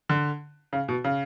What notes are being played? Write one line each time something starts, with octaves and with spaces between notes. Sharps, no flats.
D3
C#3
B2
C#3